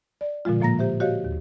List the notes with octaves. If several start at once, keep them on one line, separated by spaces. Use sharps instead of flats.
D5
A#2 D3 F3 G#3 F4
A2 F3 A#3 A#5 A#6
G4 C5 E5
F#4 G4 C#5 D#5 F5
D#2